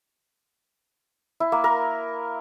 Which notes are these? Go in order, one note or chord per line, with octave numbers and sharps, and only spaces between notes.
E4
A#3
A#4